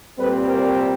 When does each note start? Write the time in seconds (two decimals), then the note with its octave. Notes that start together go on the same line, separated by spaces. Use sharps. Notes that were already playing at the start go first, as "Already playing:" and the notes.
0.20 A#2 G3 C4 A4 B4
0.48 A#4 C5